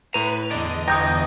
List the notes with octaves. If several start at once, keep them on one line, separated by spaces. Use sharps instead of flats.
A2 B4 A#5 D#7
E2 D3 D5 D#5
G1 G5 A#5 D#6 G6 A#6